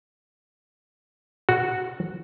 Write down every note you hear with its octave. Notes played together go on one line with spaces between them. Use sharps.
F#4